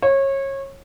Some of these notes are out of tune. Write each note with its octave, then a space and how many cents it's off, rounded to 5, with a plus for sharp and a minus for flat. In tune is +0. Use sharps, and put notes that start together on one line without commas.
C#5 -25